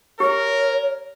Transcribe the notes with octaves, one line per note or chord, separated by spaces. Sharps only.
G4 A#4 C#5